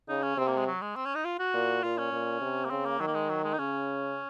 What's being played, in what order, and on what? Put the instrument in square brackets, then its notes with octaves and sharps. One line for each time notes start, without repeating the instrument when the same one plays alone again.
[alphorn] C#3 [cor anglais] D#4
[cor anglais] C#4
[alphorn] C3 [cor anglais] C4
[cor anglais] A#3
G#3
F#3
G#3
C4
C#4
D#4
F4
F#4
[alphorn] A#2
[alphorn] A#2 [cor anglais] F4
[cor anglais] C#4
[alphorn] A#2
C3
[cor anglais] A#3
[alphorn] C#3 [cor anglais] C4
[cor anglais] A#3
[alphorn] D#3 [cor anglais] F#3
[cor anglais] A#3
G#3
F#3
G#3
D#4
[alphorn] C#3 [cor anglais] C#4